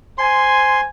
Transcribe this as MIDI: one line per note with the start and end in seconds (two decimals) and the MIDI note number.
0.18 0.87 72
0.18 0.87 80
0.18 0.81 84